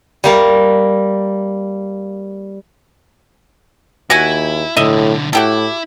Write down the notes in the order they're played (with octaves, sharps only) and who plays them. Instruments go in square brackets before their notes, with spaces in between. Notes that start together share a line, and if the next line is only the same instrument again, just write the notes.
[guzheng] G3 A#3 F5
[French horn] D#2 [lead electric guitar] E4 [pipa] F#4 F#5 G#5
[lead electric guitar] B1 D3 [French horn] A2 [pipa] D#5 E5
[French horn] A2 [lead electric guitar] E4 [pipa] F#4 G4 A4